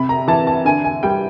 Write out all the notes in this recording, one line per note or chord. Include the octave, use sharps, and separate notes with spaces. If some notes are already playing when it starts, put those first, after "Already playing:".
Already playing: C3 B5
A#5
E3 A5
A5
D3 G#5
G#5
G3 G5